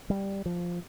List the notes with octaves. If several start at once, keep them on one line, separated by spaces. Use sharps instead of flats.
G3
F3